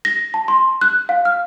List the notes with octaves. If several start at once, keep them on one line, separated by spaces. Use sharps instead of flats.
A#6
A5
C6
F#6
F5
F6